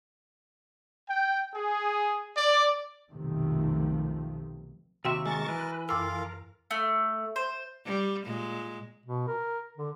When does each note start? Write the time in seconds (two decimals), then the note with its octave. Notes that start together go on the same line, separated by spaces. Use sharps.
1.08 G5
1.54 G#4
2.37 D5
3.11 B1 F2 C3 D#3 F3 A3
5.05 D#2 C3 F#4 E5 G5 C6 C#6
5.26 G#3 A#4 G#5 A5 C#6 A6
5.49 E3 B4
5.89 F#2 F4 A4 A#4 F5 D6 E6
6.71 A3
7.36 C5
7.86 G3
8.25 A#2 G#3
9.06 B2
9.27 A#4
9.77 D3